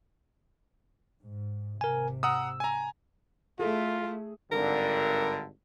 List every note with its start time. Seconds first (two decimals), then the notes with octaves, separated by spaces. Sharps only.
1.22 G#2
1.81 G#1 C3 A#4 G#5
2.23 F#5 A#5 D#6 E6
2.60 G#5 A#5
3.59 A3 E4 F4 G#4 A4
4.52 G#1 G2 D3 A#4